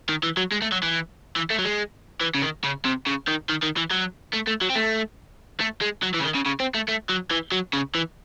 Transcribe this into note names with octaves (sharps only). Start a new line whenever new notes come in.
D#3
E3
F#3
G#3
A3
F#3
E3
E3
A3
F#3
G#3
E3
C#3
D#3
C#3
C3
C#3
D#3
D#3
D#3
E3
F#3
A3
A3
F#3
C4
A3
A3
G#3
F#3
E3
C#3
D#3
C#3
C#3
C4
A3
A3
F#3
E3
F#3
C#3
E3